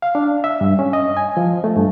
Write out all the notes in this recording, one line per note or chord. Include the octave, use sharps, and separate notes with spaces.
F5
D4
E5
G2
C#4
D#5
G#5
F3
A3
G2